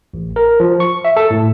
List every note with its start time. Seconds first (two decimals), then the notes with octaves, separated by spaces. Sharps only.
0.14 A1
0.36 A#4
0.60 F3
0.80 C#6
1.05 E5
1.17 A4
1.30 A2